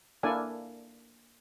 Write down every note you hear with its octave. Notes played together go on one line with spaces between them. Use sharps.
A#3 D4 E4 A4 D5 G#5